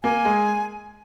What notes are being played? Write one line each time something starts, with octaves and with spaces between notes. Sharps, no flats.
A#3 G#5
G#3